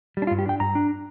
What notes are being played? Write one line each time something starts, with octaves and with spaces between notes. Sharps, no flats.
G3
D4
F4
G2
G4
D4 G5
G2 A#5
D4